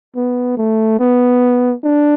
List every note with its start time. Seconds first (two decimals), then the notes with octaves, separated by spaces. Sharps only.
0.16 B3
0.57 A3
0.99 B3
1.84 D4